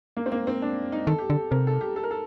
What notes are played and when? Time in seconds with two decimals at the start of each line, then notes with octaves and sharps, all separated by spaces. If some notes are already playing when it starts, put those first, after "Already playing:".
0.17 A#3
0.26 C4
0.32 A#3
0.47 C4
0.62 D4
0.92 D#4
1.07 D#3 A4
1.18 G4
1.30 D3 A4
1.51 C3 A#4
1.67 A4
1.81 G4
1.96 A4
2.03 A#4
2.11 A4